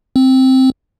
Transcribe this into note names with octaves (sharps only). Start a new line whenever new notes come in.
C4